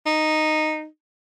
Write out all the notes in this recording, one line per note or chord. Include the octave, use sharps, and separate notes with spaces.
D#4